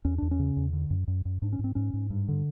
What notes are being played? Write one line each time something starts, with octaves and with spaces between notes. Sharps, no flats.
E2 C#4
E2 D4
C#4
C#3
E2
D3
F#2
F#2
F#2
G#2 D4
C#4
G#2 C4
G#2 C#4
G#2
G2
D3